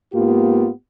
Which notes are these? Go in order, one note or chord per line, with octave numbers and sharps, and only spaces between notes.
G#2 A#3 B3 F4 G4